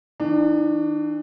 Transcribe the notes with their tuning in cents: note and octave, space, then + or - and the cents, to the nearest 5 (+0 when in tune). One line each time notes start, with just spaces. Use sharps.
E3 -25 D4 +30